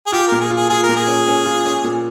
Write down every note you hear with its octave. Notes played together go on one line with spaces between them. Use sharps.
G#4
F4 G4
A#2 A#4
G#4
F4
G#4
F4 G#4
A#4
A#2
G#4
C#4
C#4
F4
C#4
A#2